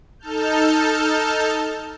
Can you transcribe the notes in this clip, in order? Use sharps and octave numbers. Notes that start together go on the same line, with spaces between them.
D#4 A4 A5 F6 G6